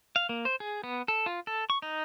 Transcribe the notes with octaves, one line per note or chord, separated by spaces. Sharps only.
F5
A#3
C5
G#4
B3
A4
F4
A4
C#6
D#4